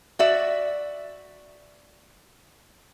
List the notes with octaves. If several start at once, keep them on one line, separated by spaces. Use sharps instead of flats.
F#4 D5 E5